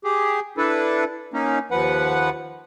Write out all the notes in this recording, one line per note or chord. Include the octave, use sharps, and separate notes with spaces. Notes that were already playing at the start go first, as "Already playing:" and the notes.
G4 G#4
D4 E4 A4 B4
A#3 C#4 D#4
D#2 F3 B4 F#5